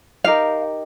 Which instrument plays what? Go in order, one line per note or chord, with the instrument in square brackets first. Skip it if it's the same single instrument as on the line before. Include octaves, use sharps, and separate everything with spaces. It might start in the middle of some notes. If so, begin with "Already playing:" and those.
[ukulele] D#4 G4 A#4 F5